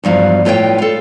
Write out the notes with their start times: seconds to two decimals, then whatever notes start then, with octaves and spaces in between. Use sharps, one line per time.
0.04 E2 G2 F3 F#3
0.45 A2 F4 B4 C#5 G5
0.78 F4 A4